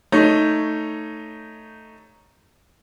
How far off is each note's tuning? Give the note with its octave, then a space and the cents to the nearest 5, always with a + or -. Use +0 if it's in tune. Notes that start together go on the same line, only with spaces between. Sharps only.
A3 +10 D#4 +0 C#5 +5